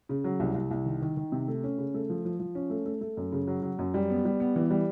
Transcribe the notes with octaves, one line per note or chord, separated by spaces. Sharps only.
C#3
F#3
C2
C2
C2
D#3
D#3
D#3
C3
A3
C#4
C#3
A3
F3
F3
F3
C#4
A3
A3
A3
F#2
C#3
F#3
F#3
F#2
G3
B3
G3
B3
E3
G3